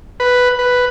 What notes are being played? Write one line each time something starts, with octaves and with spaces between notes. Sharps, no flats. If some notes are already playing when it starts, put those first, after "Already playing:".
B4
B4